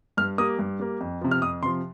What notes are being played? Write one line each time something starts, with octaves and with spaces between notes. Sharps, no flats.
G2 F6
G3 A#3 D#6
G2
G3 A#3
F2
C3 F3
F6
F2 D#6
C3 F3 C6